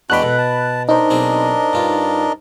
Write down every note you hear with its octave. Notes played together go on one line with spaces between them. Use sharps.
E2 G#3 D4 F#4 G5 B5 F#6
B2 A4
A5
D4 D#4 A#4 C5 D#5
B1 C4 G#4
G2 F4